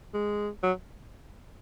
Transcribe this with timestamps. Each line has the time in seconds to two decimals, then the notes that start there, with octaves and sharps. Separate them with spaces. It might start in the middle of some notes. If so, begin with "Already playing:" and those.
0.14 G#3
0.63 F#3